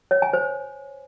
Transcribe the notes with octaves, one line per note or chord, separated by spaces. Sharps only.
C#5
G#5
C5